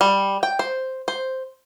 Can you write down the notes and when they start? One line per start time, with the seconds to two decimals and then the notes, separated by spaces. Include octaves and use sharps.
0.01 G3
0.43 G5
0.59 C5
1.08 C5